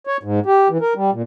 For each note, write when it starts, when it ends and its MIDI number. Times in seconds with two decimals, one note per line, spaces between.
0.07 0.17 73
0.23 0.40 44
0.46 0.68 67
0.70 0.78 52
0.81 0.94 70
0.96 1.10 55
1.12 1.22 46